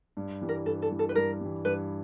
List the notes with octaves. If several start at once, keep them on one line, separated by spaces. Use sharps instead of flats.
G2
E3 G3
A#4
G2 A4
A4
E3 G3
A4
B4
G2 A#4
E3 G3
G2 B4